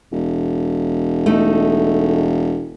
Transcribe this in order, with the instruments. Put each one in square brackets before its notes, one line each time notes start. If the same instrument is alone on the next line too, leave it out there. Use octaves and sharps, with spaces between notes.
[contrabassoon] E1
[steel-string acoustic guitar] A3 D#4